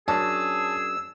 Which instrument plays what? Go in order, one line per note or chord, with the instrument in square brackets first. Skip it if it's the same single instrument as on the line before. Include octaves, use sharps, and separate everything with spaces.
[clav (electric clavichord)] F#2 C#4 D4 [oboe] G#4 [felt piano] A5 [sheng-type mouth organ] E6